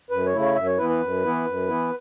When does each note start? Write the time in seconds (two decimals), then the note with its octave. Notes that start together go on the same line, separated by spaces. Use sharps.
0.11 F#2 B4
0.26 C#5
0.33 C#3 A3 E4
0.41 C#5
0.55 F#2 E5
0.66 C#5
0.78 E3 B3 E4 B4
0.89 B4
1.01 F#2
1.24 E3 B3 E4
1.46 F#2
1.68 E3 B3 E4